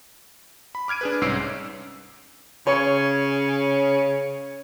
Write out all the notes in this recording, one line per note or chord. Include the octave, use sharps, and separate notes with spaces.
B5
D6 F6 G#6 D7 D#7
D4 G#4 B4
C2 G#2 C#4 E6 C7 D7
C#3 C#5